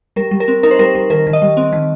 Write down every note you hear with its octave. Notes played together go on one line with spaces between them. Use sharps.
G3 A#4
G3
A#4
C4
D#4 A#4
C5
G3 A#4
G3
D#3 A#4
D#3
D#5
G3
C4
D#3